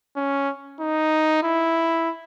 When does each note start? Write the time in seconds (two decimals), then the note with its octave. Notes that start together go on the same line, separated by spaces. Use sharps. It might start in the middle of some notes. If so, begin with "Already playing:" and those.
0.16 C#4
0.80 D#4
1.43 E4